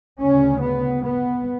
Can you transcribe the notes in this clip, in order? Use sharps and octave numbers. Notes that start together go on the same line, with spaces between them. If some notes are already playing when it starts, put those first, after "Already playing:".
D2 C#3 C#4
B3
B3